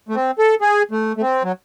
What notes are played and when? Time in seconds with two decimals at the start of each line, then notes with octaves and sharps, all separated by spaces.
0.09 A3
0.15 C4
0.39 A4
0.61 G#4
0.91 A3
1.17 A3
1.22 C4
1.44 F#3